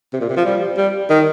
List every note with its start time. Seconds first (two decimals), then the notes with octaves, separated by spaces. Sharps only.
0.13 C3
0.21 A#2
0.30 C3
0.37 F3
0.45 G3
0.77 G3
1.10 D#3